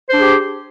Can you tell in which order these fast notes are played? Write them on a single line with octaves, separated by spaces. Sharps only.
C5 D4 G#4 G4